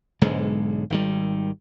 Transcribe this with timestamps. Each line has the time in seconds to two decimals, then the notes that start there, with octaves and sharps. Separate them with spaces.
0.22 B1 G#2 D3 G#3
0.90 G#1 D#3 G3